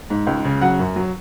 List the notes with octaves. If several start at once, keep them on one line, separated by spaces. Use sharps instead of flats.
G#2
C#2
C#3
F#3 F#5
F#2
F#3